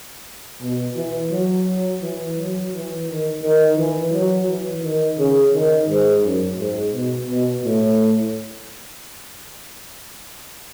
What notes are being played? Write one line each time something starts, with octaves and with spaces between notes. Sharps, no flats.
B2
E3
F#3
E3
F#3
E3
D#3
D#3
E3
F#3
E3
D#3
C#3
D#3
G#2
F#2
G#2
B2
B2
A2